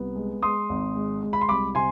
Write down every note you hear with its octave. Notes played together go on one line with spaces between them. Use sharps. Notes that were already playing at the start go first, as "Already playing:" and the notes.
Already playing: C2 B3
G#3
G#3 C6 D#6
G#1
G#3
G#3
B5
C6
C2 B5 D6
C3 G#5 C6